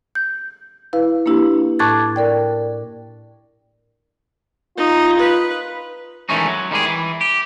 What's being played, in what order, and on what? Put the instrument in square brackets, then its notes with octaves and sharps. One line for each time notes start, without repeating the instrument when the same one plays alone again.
[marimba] G6
E4 B4 F5
A#3 D4 E4 G4
A2 A5 D6 F#6 G#6 A6
A#4 D5 G5
[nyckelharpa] D#4 [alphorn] F4
[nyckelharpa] B4
[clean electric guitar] D#3 E3 G#3 A3 C#4 D#4
F#3
D#3 G3 G#3 G#4
E3
G4